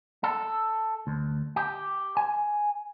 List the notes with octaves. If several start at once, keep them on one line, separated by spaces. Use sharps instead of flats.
A4
D2
G4
G#5